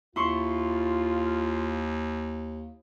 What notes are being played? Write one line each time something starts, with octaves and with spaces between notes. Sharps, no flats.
D#2 E4 F4 C6 C#6